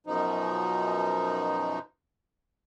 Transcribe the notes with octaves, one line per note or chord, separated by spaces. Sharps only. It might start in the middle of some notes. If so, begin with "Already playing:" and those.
F#2 B2 F3 D#4